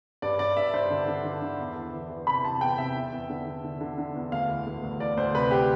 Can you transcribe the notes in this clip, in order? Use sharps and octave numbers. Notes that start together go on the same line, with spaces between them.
G2 D5
G2 D5
G2 E5
G2 C5
D3
D3
D3
D3
E2
E3
E3
E3
C3 B5
C3 A5
E2 G5
C3 E5
E2
E2
D3
D3
D3
D3
D3
E2
D2 F5
E3
D2
D2
E3 D5
D2 C5
C3 B4
G4